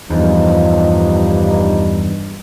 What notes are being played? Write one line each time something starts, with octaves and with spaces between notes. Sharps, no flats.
E2 G2 F3 D#4